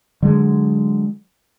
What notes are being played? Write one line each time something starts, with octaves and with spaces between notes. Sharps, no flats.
D3 F#3 G#3